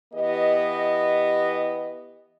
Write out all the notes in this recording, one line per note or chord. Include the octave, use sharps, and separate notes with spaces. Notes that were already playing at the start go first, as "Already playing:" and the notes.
E3 B3 G4 D#5